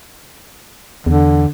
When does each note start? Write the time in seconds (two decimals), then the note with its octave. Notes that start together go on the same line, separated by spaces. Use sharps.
1.06 E2 D3